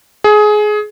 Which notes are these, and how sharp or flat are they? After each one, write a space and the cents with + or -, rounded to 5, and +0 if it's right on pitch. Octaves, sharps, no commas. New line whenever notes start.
G#4 +20